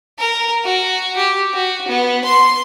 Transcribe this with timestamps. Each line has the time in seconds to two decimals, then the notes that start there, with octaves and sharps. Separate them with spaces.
0.19 A#4
0.65 F#4
1.17 G4
1.54 F#4
1.88 B3
2.25 C6